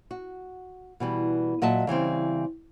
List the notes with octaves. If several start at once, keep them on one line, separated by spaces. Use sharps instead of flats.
F#4
B2 E3 G3
A#2 F#3 D#5 E5 A5
C#3 E3 G3 C4